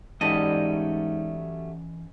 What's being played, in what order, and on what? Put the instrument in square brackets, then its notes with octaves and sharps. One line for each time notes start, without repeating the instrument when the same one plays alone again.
[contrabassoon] G#2 [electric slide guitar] E3 C#4 A5 [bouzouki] F#3 G3 A3 [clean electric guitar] D#5